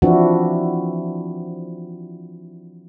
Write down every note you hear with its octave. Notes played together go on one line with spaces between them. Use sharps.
E3 F3 C4 D4 E4 F#4